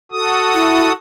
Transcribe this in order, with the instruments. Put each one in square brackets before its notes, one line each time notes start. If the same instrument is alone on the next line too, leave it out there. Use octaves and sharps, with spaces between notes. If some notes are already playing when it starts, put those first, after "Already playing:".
[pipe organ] F#4 A4 D#6
[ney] E4